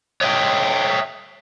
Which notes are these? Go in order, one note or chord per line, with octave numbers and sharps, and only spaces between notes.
C#5 D#5 E5 G5